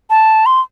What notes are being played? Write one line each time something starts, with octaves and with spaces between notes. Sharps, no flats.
A5
C6